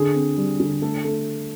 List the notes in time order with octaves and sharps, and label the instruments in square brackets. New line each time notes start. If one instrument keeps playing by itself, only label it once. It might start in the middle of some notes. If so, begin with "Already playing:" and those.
Already playing: [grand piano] D3 G#4
C4
G3
D3
A3 A4
A3